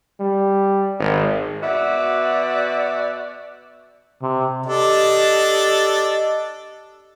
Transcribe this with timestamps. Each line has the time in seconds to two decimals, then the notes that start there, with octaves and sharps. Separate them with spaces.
0.20 G3
0.99 G#1
1.62 B2 F#4 D5 E5
4.22 C3
4.66 D4 G4 A4 D#5